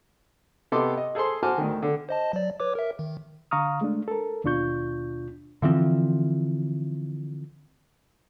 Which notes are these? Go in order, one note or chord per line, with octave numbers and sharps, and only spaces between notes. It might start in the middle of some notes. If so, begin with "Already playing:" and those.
C3 B3 A4 D#5 C6 D6
D#5
G#4 A4 C5 A5 C6
F#4 C5 G#5 A5 D6 F6
D2 D#3
D3
C5 D#5 A5
F#3 D5
B4 C#5 D6
A#4 E5
D#3
D3 F5 A#5 C#6 D#6 F6
G#3 A3 D4
A4 A#4
D#2 B2 D4 F4 C#6 G6
D3 E3 F3 C4